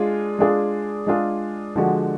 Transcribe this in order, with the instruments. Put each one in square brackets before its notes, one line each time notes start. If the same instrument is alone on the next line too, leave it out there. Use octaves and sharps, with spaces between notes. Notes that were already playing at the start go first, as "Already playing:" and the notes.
Already playing: [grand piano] G#3 D4 F4 G#4
G#3 D4 F4 G#4
G#3 D4 F4 G#4
D3 F3 G#3 D4 F#4